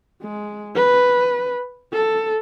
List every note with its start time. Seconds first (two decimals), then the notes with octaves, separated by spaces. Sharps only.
0.22 G#3
0.75 B4
1.93 A4